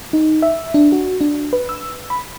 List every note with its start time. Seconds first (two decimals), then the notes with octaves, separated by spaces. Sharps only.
0.13 D#4
0.42 E5
0.74 D4
0.92 F#4
1.21 D4
1.53 B4
1.69 E6
2.10 B5